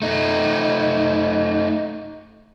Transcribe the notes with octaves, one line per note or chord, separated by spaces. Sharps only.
A3 D#4